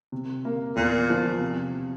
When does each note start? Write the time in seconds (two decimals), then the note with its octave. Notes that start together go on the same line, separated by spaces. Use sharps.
0.12 C3
0.45 A#3
0.76 E2 A#2
1.10 F3
1.41 C3